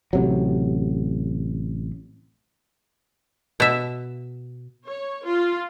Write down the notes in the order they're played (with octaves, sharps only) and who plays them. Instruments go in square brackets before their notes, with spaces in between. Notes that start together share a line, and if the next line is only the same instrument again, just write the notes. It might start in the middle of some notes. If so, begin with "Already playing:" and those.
[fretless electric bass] A1 C3 F#3
[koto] B2 E5
[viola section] C#5
F4